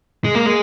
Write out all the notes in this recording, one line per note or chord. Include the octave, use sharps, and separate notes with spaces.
G#3
A#3
G#3